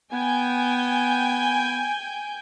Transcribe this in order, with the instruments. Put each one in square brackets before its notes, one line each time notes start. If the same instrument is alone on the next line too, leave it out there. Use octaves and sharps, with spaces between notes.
[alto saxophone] B3 [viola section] G5 G#5